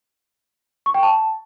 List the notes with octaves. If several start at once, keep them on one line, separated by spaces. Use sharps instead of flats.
C#6
G5
A5